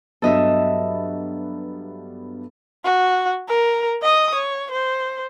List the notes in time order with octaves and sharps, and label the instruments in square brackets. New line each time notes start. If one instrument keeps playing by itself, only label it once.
[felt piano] G2 F#3 B3 [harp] A4 D#5 E5
[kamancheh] F#4
A#4
D#5 D#6
C#5
C5